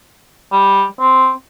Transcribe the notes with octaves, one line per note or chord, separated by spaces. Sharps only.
G3
C4